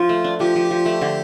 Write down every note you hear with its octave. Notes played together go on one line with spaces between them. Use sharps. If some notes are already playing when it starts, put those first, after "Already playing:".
Already playing: F3 F4
A3
D4
F3 G4
F3
F3
A3
D3